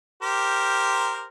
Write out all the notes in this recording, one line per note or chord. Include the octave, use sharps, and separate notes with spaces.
G4 A#4 C5